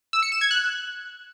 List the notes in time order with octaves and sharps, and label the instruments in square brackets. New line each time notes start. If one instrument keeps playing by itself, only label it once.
[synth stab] E6
C#7
E7
G#6
F#6